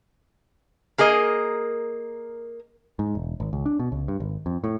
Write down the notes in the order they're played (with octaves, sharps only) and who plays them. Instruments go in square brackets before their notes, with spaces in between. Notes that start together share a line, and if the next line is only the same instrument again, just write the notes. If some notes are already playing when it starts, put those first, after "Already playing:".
[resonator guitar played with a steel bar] A#3 G#4 A#4 D#5
[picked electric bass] G#2
E1
G#1
C#2
D4
B2
C#2
G2
G#1
F2
A2